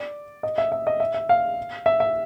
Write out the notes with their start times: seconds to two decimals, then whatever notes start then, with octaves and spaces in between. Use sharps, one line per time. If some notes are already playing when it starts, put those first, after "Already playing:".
Already playing: D5
0.43 D#5
0.58 E5
0.72 E5
0.87 D#5
1.00 E5
1.14 E5
1.29 F5
1.86 E5
2.00 E5